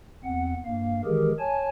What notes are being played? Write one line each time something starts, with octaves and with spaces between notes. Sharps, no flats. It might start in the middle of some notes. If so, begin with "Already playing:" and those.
E2 C4 F#5
G2 A#3 F5
D#3 E3 G#3 G4 G#4 A#4
C#5 G#5 A5